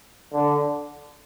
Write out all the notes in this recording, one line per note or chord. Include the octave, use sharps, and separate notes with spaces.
D3